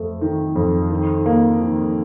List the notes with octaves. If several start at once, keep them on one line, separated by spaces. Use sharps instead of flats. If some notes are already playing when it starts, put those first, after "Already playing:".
Already playing: F2 A3
D#3
F2
D#3
A#3
D#3